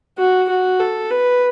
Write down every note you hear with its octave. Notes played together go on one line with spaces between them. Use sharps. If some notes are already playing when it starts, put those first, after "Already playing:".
F#4
F#4
A4
B4